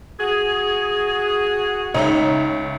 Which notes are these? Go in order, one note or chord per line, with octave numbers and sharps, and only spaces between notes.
F#4 G#4
C#2 D#4 C#5 E5